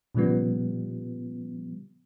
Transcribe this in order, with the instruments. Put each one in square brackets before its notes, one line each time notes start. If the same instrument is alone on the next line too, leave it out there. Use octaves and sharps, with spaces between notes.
[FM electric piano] A#2 C#3 F3 G3 B3